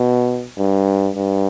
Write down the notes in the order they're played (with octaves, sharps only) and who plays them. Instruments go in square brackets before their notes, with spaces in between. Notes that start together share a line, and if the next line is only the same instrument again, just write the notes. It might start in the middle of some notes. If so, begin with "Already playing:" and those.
Already playing: [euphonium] B2
G2
G2